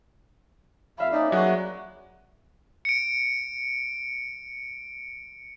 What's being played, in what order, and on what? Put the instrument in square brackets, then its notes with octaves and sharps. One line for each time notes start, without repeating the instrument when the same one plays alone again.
[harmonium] F2 [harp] E5 B5 [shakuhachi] F5
[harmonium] A#3 C#4 D5 [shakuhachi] D#4
[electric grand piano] F#3 [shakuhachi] F#4 [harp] G#4
[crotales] C#7 D7